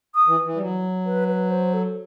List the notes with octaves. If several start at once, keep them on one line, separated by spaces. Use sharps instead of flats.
D#6
E3
E3
G3
F#3
B4
B4
C5
A4